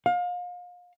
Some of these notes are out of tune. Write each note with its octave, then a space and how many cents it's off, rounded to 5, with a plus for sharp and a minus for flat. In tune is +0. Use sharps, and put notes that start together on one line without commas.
F5 +35